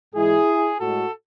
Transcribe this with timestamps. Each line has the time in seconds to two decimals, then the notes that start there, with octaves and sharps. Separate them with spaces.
0.14 G#2 E3 G#3 E4 G#4
0.80 A2 G#3 F#4 A4